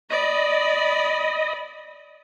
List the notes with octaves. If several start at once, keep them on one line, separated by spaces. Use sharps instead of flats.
D5 D#5 B5